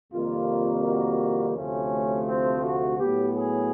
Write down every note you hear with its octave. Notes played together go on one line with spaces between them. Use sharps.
F2 C3 D#3 G3 A#3 F4
F#4
D2 C3 F3 A3 C#4
C4
F#4
A2 F#3 B3 G4
G#4